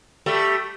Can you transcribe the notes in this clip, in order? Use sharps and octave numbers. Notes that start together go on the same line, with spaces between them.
G3 A3